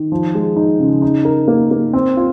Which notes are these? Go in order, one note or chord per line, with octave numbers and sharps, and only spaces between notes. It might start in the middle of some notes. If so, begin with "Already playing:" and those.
Already playing: D#3
F3
G#3
D#4
C#3
D#4
A#4
A#3
A#3
C4
F4